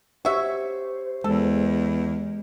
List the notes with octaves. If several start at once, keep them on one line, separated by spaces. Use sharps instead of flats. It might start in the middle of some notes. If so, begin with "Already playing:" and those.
F#4 G4 C5 C#5 E5
E2 G#3 A4